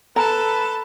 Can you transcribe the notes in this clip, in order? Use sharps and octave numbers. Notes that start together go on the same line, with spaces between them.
A4 B4 A5 A#5